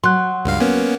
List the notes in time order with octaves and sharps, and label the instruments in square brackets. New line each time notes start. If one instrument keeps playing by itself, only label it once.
[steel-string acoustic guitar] F#3 [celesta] C6 F#6
[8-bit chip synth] C#2 G2 F5
A#3 B3 C#4